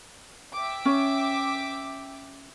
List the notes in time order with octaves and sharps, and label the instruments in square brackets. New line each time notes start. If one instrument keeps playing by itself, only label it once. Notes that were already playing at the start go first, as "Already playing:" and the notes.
[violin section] E5 G5 D6
[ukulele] C#4